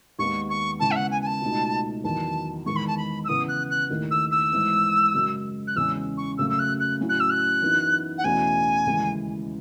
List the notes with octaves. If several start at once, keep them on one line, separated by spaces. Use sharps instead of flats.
D#2 D#3 G#3 B3 C#6
C#6
C#3 G#3 B3 E4 A5
E5
F#5
G#5
G#5
A5
C#2 B2 A3 D#4
E2 D#3 F#3 A5
E2 D#3 G#3 C#6
B5
A5
B5
E6
C#3 E3 B3 E4 D#6
F#6
F#6
D#2 D#3 A3 E4
E6
E6
G#2 E3 B3
F#2 C#3 G#3
F#6
E2 C#3 G#3 C#4 E6
C#6
F#2 C#3 F#3 A3 E6
E6
F#6
F#6
A2 F#3 C#4 E4
F#6
E6
F#6
F#2 E3 B3 D#4
F#5
E2 B2 A3 C#4 G#5
D#2 C#3 E3 G#3